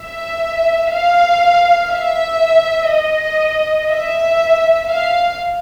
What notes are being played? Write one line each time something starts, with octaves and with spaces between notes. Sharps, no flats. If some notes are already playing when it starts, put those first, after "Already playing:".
Already playing: E5
F5
E5
D#5
E5
F5